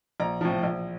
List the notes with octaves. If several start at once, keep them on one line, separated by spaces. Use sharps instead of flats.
A#1 A#5
A2 F3
A#1